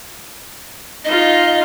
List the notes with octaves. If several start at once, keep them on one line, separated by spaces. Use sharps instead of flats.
D#4 F4 D#5